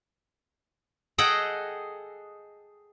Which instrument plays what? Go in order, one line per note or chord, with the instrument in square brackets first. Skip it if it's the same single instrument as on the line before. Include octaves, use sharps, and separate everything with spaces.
[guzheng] G#4 A4 D#5 F#5 G5